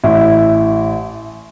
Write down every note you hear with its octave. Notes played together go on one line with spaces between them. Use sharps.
A1 E4